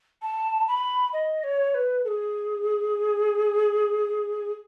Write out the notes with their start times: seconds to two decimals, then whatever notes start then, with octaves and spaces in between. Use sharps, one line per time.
0.22 A5
0.67 B5
1.13 D#5
1.43 C#5
1.74 B4
2.04 A4
2.08 G#4